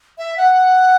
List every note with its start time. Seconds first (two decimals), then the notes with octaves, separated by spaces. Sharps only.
0.18 E5
0.37 F#5